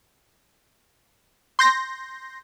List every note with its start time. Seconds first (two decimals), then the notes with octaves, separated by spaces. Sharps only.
1.59 C6 G6 A#6